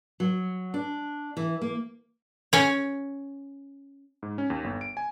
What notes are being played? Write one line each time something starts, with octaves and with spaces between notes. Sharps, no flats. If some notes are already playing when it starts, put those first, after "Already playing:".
F#3
D4
E3
A#3
C#4 C#5
G#2
C#4
D#2
G1
D7
G#5